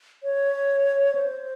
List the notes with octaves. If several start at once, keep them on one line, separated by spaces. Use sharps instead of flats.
C#5
C5